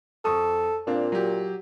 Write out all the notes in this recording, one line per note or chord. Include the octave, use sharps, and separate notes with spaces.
F2 A4 C#6 D#6
A#2 C4 D4 F5
F#3 G4